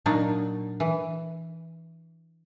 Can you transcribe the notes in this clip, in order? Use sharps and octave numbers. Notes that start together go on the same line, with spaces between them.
A#2 F#3 D4 D#4
E3